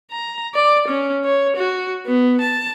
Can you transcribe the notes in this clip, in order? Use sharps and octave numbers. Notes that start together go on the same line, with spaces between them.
A#5
D5
C#4
C#5
F#4
B3
A5